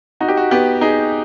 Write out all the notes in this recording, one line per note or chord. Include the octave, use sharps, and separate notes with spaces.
D#4 F#4
G4
F#4
B3 G4
D#4 G#4